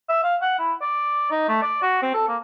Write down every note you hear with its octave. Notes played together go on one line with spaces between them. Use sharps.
E5
F5
F#5
E4
D5
D#4
A3
D5
F#4
C4
A4
A#3